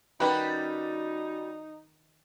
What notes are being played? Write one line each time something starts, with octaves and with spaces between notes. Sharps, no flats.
D#3 G3 C#4 D#4 F#4 B4